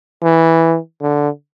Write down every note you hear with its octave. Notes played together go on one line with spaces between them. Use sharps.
E3
D3